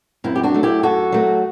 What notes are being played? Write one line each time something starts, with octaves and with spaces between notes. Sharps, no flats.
F#2 C4 E4
G4
D4 F#4
F#3 A3
E4 G4
F#2 F#4 A4
F#3 A3